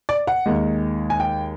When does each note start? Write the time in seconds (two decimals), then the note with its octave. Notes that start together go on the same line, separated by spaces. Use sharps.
0.09 D5
0.27 F#5
0.46 D#2 D#3 G#3
1.10 G#5
1.20 G5